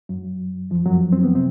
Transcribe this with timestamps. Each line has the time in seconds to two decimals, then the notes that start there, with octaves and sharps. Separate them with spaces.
0.09 F#2 F#3
0.71 F2 F3
0.86 F#2 F#3
1.13 C4
1.23 B3
1.35 C3 C4